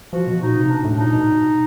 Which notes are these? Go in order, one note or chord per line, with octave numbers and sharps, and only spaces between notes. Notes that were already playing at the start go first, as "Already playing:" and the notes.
F3 F#4
B2
A#2 D#4
C3
B2 D4
A2
A#2 D#4
B2